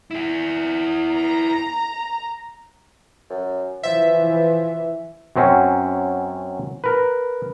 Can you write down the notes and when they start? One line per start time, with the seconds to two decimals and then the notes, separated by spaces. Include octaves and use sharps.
0.11 E4 G#4
1.14 A#5
3.30 F#2
3.83 E3 F3 E5
5.36 F#2 F#3 C4 C#4
6.84 A#4 B4